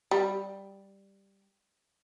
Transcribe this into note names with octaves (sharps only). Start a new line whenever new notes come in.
G3